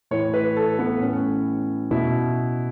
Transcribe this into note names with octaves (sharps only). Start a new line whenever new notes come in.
A2 E3 C#5
B4
A4
B3
A2 E3 C#4
B2 E4